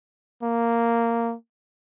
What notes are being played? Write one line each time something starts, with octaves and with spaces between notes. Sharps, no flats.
A#3